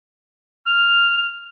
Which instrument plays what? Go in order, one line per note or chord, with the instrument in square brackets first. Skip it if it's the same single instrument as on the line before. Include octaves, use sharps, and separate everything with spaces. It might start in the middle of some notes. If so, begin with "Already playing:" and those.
[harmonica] F6 [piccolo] F7